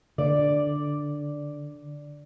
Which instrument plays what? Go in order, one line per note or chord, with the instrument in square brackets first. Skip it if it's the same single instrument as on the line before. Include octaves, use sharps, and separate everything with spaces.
[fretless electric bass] D3 [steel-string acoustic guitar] D5